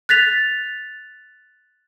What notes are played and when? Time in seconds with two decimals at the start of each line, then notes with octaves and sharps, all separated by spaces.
0.09 F#6 A6 B6 F7